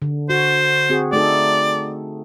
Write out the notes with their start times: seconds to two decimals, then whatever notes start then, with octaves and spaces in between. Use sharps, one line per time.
0.02 D3
0.30 F#4 C5
0.90 C4 F#4 G#4
1.13 A3 D#4 A4 D5